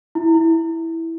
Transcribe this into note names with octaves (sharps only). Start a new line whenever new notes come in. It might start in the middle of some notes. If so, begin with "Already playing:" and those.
E4
E4